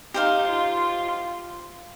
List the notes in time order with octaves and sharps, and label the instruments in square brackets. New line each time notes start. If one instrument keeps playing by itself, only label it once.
[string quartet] D#4 [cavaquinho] G4 C5 F5
[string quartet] F4
F4